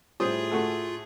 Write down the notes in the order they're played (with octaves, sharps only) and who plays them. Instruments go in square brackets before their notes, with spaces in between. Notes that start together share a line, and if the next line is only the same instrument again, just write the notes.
[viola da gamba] A2 G#4 [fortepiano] G3 C5 D#6 [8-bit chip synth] F4
[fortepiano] A3 F#4 A4